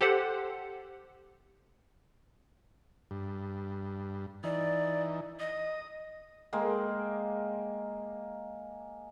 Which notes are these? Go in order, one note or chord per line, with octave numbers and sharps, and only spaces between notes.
G4 A4 C5 F#5
G2
E3 D#4 D5
D#5 D#6
G#3 A#3 G5